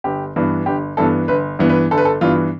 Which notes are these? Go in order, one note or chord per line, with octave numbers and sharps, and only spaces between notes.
G1 G4
G2 E3 B3
G1 G4
G2 E3 B3 A4
G1 B4
G2 E3 B3
B4
G1 A4
B4
A4
G2 E3 B3 F4